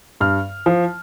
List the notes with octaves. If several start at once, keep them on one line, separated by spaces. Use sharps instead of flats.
G2 F6
F3